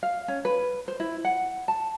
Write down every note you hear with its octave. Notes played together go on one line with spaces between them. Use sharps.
F5
C#4
B4
C5
E4
F#5
A5